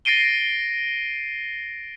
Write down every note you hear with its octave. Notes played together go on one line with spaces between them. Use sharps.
A6 A#6 C7 D7 D#7 G7